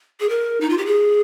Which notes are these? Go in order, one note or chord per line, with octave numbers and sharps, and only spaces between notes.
G#4
A#4
D#4
F4
G4
G#4